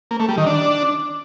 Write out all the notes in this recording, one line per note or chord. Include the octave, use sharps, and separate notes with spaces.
A#3
A3
G3
D#3
D4